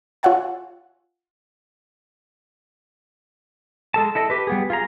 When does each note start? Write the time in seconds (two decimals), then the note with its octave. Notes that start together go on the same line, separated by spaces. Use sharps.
0.23 F4 C#5 E5 F#5 G#5 A5
3.94 G#3 A4 A5
4.15 E4 A4 D#5
4.30 G4 B4
4.47 G3 B3 G#4
4.70 F4 G#4 A#5